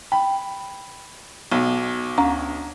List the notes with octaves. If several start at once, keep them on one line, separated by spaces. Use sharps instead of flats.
G5 B5
B1 B2
D2 C#4 A#5